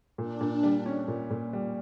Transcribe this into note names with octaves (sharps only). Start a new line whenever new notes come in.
A#2 D4
A#2
G3
C#4
A#2
A#2
G3